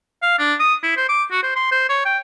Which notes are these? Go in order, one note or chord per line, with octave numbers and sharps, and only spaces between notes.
F5
D4
D#6
E4
C5
D6
F#4
C5
C6
C5
C#5
G5